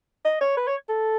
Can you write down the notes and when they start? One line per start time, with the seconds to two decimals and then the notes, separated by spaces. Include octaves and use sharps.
0.25 D#5
0.41 C#5
0.57 B4
0.68 C#5
0.89 A4